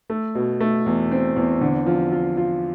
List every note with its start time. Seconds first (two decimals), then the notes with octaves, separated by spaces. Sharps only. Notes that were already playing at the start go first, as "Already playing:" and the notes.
0.10 A3
0.35 B2
0.61 A3
0.86 E2
1.12 C4
1.36 E2
1.61 D3
1.86 F3
2.12 F4
2.37 F4